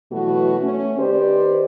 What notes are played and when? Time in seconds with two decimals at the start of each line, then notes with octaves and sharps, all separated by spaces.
0.12 B2 E3 F#3 A3 F#4
0.62 A3 C#4
0.98 D#3 D#4 G4 B4 C5 D5